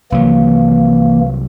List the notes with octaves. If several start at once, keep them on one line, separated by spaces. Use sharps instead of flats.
C2 D#3 E3 F#3 A#3